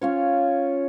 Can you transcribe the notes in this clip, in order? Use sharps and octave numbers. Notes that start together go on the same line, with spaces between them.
C#4 F4 C#5